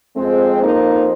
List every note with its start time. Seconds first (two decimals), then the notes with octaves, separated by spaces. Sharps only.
0.16 F2 F3 G#3 C4
0.62 A#3 D#4